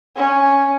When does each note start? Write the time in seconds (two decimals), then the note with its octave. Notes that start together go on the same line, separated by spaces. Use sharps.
0.16 C#4